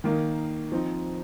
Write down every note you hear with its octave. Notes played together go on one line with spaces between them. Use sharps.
D#3 A#3 D#4
F3 C4 D#4